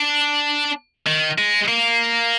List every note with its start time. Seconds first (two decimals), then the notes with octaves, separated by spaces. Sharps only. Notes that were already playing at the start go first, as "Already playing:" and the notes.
Already playing: D4
1.07 D#3
1.38 G#3
1.68 A#3